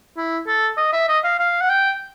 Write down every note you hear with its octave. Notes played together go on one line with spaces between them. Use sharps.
E4
A4
D#5
E5
D#5
F5
F5
F#5
G5